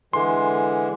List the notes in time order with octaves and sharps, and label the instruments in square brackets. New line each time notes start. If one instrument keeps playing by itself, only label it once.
[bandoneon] D3 E3 G#3 [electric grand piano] C6